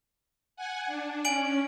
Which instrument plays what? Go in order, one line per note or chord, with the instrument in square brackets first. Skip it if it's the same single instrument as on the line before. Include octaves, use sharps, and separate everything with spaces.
[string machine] F#5 G#5
D4
[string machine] C#4 [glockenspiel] G#5 D7 F#7